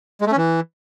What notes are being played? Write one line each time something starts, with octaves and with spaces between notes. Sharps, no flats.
G#3
A3
C#4
E3